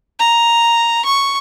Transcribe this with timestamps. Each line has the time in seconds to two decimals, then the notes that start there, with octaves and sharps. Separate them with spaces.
0.19 A#5
1.05 C#6